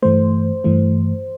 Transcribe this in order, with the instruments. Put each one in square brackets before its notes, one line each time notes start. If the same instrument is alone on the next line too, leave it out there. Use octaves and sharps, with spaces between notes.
[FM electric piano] G2 E3 A3 C5
G2 E3 A3